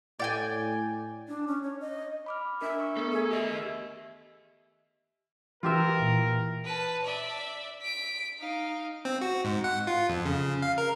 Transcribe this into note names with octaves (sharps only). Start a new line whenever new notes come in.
A2 D5 G5 G#5
D4
C#4
C#5
D#5
B5 D6 F6
D4 A#4 E5
C#6
A3 B3 A4 A#4
G#4
G4 D#5 E5
E3 F4 G4 A#4 E5
A#2
B4 A5
D5 E5
B6 D7
D#4 F5
C4
F#4
G#2
F#5
F4
F2
C#3
F5
A#4